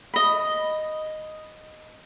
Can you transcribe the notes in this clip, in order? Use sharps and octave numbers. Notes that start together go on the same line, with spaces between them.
D#5 B5